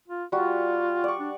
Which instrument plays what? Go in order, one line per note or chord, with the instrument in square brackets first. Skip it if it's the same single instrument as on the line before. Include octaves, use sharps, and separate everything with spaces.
[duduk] F4
[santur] G3 F#4 [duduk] F4
[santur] D5 C#6
[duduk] D4